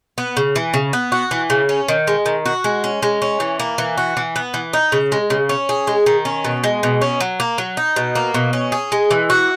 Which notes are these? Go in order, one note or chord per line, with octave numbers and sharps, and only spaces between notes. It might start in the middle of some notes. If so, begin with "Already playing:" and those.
B3
C#3
E3
C#3
B3
F#4
E3
C#3
C#4
D#3
G#3
D#3
F#4
G#3
C#4
G#3
C#4
E3
A#3
E3
F#4
E3
B3
E3
D#4
C#3
G#3
C#3
C#4
G#4
G#3
D#3
C#4
B2
G#3
B2
C#4
F#3
A#3
F#3
D#4
B2
A#3
B2
C#4
G#4
G#3
E3
F#4